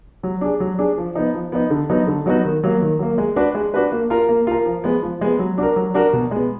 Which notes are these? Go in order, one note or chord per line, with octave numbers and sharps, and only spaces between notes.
F#3
D4 G#4
F#3
D4 G#4
F3
B3 D#4
F3
B3 D#4
D3
F#3 B3 D#4 F#4
D3
F#3 B3 D#4 F#4
D#3
F#3 A#3
D#3
F#3 A#3
G#3
D4 F#4 B4
G#3
D4 F#4 B4
A#3
F4 A#4
A#3
F4 A#4
F3
G#3 B3
F3
G#3 B3
F#3
D4 F#4 A#4
F#3
D4 F#4 A#4
B2
G#3 B3